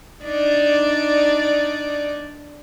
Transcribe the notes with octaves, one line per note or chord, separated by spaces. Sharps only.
D4 D#4 D5